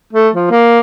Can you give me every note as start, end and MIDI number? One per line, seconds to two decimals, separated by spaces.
0.13 0.29 57
0.34 0.49 53
0.51 0.80 58